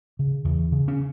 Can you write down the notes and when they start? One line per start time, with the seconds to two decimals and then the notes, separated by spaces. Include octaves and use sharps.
0.19 C#3
0.45 E2
0.72 C#3
0.88 C#4